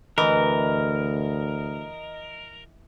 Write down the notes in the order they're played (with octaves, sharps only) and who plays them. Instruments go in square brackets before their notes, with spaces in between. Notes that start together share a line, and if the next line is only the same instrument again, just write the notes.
[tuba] D2 [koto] E3 [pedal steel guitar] A#4 [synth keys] D#5